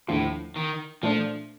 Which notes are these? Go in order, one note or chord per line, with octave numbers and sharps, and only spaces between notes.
D#2 A2 D3 F3
D#3
A#2 F3 A3 D4